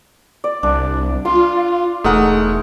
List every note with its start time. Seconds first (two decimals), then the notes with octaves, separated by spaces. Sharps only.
0.44 D5
0.63 C2 D4
1.25 F4 C6
2.04 E1 A3 D#4 G#4 A#4 F#5